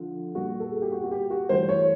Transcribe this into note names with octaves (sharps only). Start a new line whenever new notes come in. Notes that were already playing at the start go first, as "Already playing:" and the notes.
Already playing: D3 F3
A#2 G3 F#4
A4
G#4
G4
F#4
F#4
G4
F#4
G2 E3 A3 C5
C#5